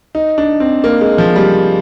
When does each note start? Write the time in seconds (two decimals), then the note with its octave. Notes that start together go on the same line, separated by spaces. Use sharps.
0.15 D#4
0.38 D4
0.60 C4
0.84 A#3
1.01 G#3
1.18 F3
1.36 G3